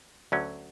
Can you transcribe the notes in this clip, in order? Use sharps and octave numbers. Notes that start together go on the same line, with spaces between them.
D2 D3 F#3 C#4